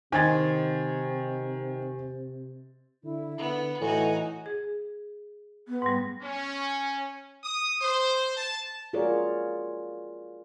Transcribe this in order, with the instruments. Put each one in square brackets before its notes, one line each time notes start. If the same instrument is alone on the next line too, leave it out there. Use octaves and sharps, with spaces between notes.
[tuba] C3 [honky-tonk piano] D#3 [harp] C5 D#5 [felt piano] G#5 G#6 A6
[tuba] D3 [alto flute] E4
[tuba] D3 [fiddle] B3
[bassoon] A2 [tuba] E3 [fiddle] D#4 F#4 [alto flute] G#5
[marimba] G#4
[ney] B3
[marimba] G#2 G3
[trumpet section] C#4
D#6
C5
A5
[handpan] F4 F#4 G#4 A#4 C#5 D5